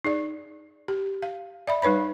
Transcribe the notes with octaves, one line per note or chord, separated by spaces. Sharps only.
D#4 G#4 D5
G4
F5
D5 E5 B5
G3 D#4 B4 C#5 B5